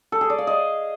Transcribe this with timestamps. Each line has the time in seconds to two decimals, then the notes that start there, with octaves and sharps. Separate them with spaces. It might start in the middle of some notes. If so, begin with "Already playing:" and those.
0.12 A4
0.21 G#4
0.30 D5
0.38 F5
0.47 D#5